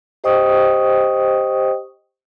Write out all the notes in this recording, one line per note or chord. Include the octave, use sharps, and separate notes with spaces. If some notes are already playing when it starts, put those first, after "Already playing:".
G4 C5 D#5 G5 C#6 D#6